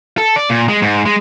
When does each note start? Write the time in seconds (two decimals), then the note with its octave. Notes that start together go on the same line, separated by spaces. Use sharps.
0.18 A4
0.36 D5
0.50 A#2
0.68 G#3
0.82 G#2
1.06 G#3